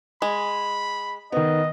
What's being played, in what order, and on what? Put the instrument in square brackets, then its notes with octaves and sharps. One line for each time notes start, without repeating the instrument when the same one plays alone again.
[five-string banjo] G#3 [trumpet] B5
[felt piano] D#3 B3 [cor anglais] D#5